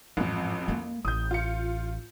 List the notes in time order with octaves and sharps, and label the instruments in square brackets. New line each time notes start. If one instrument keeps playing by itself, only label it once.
[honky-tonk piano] A1 F2 [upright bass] G#2
[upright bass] A3 A#3
[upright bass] A1 [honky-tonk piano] D#6 G6
[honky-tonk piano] F4 C#7